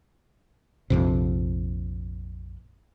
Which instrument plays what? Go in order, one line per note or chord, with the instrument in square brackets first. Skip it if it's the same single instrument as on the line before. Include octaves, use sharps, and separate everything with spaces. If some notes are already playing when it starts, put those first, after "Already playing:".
[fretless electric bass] A#1 F2 C3